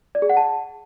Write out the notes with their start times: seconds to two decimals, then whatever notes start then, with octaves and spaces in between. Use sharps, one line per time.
0.15 D5
0.22 G#4
0.29 F#5
0.37 A5